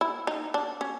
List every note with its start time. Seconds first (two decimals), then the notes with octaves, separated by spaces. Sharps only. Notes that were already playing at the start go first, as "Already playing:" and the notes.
0.01 E4
0.27 D#4
0.54 D4
0.81 C#4